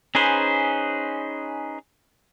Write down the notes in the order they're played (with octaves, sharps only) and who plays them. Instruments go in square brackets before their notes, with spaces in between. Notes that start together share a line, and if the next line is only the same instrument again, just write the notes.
[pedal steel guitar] C#4 D#4 G#4 B4 C5